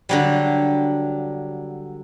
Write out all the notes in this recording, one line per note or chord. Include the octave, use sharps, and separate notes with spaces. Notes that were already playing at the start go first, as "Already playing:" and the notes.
D3 F#3 G3